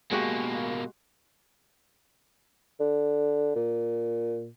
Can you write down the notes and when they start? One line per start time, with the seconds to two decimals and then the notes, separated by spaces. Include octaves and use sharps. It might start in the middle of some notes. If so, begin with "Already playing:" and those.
0.12 B2 G#3 A#3 F#4 G4
2.80 D3
3.55 A#2